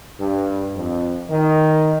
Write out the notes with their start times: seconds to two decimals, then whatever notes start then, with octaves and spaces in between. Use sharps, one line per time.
0.19 G2
0.75 F2
1.29 D#3